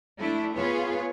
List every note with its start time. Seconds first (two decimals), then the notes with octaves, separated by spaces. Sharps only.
0.18 A3 D4 E4
0.56 B3 F4 G#4 B4 C#5